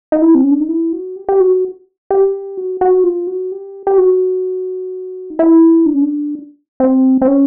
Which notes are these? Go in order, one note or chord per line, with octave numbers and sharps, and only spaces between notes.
D#4
E4
C4
C#4
D4
D#4
E4
F#4
G4
G4
F#4
G4
F#4
F#4
F4
F#4
G4
G4
F#4
D#4
E4
D4
C#4
D4
C4
C4
C#4